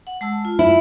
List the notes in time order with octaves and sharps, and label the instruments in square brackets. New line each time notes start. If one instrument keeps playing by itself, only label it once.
[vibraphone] F#5
G#3 A5 E6
F4
[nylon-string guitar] E4